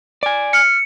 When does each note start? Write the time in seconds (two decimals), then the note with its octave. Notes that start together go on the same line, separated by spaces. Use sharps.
0.23 D5 G#5
0.53 F6 C#7